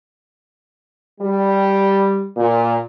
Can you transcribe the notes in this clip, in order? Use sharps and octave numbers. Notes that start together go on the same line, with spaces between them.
G3
A#2